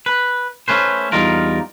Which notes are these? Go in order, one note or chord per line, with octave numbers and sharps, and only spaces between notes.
B4
A3 C#4 B4 C5
E2 G3 D#4 F4 A#4